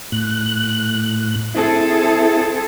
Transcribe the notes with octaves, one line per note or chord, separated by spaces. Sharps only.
A2 F#6
C4 E4 G#4 A4